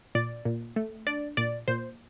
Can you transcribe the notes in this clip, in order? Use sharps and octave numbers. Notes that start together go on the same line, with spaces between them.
A#2 D5
A#2
A3
D4 D5
A#2 D5
A#2 C5